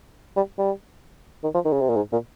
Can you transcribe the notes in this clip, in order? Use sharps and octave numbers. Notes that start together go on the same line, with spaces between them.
G3
G3
D#3
F3
D#3
C#3
C3
A#2
G#2
A#2